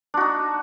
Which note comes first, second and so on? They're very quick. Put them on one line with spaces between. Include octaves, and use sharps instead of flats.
D4 F#4 D#4